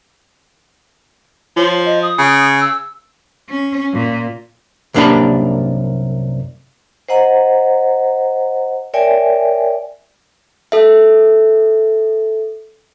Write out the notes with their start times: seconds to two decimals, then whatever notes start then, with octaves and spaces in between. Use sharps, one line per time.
1.57 F3 C#5
1.85 D#5
2.02 D#6
2.19 C#3
2.61 E6
3.49 C#4
3.93 A#2
4.94 C2 F#2 A#3 D4 G4 B5
7.08 C5 D#5 F#5 A#5
8.94 A#4 C#5 D5 E5 G5 G#5
10.72 A4 E5